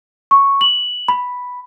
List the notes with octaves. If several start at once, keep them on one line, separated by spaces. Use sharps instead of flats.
C#6
F#7
B5